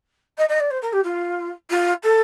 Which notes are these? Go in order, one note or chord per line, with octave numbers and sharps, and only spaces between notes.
D#5
D#5
D5
C5
A#4
G4
F4
F4
A4